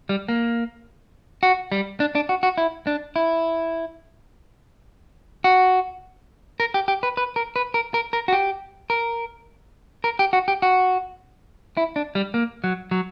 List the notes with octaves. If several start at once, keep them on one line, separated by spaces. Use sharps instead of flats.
G3
A#3
F#4
G3
D4
D4
F#4
F#4
E4
D4
E4
F#4
A#4
G4
G4
B4
B4
A#4
B4
A#4
A#4
A#4
F#4
G4
A#4
A#4
G4
F#4
G4
F#4
E4
D4
G3
A#3
F#3
F#3